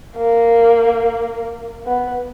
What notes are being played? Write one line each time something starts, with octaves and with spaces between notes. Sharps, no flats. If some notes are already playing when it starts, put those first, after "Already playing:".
A#3
B3